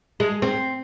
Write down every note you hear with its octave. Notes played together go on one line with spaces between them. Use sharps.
G#3
C4